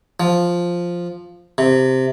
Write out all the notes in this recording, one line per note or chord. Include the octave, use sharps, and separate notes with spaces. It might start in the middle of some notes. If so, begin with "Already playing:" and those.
F3
C3